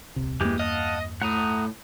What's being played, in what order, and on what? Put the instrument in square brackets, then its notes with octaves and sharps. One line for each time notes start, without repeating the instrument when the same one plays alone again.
[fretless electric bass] D#1 C2 C3
[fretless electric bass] E2 G2 A#3 [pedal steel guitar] E3 G#3 G4
[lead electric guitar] D#5 [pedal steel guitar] F5 F#5 A5
[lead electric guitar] A2 [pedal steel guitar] F#5 A#5 D#6